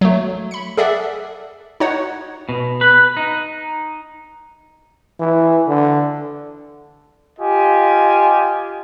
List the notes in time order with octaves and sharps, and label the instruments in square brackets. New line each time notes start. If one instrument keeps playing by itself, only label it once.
[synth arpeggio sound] F#3 A3
B5 C#7
G#4 A4 D5 E5 F#5
D#4 F#4 C#5 F#5
[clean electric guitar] B2
B4
D#4
[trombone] E3
D3
[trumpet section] F4 G4 D#5 G#5